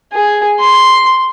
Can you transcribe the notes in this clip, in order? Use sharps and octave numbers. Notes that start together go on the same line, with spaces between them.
G#4
C6